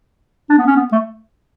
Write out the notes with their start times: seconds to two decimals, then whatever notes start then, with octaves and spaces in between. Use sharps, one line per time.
0.49 D4
0.58 B3
0.67 C#4
0.76 B3
0.92 A3